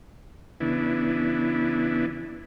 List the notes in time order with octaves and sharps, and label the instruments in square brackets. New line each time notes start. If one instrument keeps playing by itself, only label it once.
[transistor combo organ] C#3 E3 B3 D4 E4